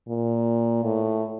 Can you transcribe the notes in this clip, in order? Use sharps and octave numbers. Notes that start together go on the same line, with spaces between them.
A#2
A2